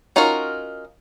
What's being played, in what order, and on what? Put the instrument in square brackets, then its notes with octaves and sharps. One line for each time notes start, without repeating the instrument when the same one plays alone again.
[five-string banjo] C#4 D#4 F4 F#4 A#4